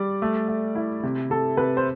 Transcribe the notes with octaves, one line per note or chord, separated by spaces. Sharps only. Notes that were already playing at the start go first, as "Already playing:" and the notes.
Already playing: G3 D5
A3
A3
E4
C3
C3 A4
C3 B4
C5